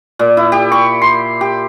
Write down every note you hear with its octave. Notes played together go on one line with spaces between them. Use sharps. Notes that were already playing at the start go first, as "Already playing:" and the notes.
A#2
E4
G4
C#6
C6
G4